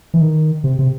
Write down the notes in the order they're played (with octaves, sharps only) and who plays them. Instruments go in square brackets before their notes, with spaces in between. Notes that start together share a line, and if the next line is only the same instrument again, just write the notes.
[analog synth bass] E3
D#3
C3
C3